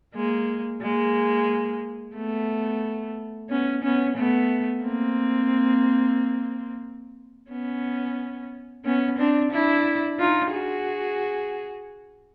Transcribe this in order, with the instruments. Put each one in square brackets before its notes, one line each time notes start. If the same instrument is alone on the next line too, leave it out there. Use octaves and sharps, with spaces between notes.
[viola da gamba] G#3 A#3
G#3 A#3
A3 B3
B3 C#4
B3 C#4
A3 B3
A#3 C4
B3 C#4
B3 C#4
C4 D4
D4 E4
D#4 F4
F#4 G#4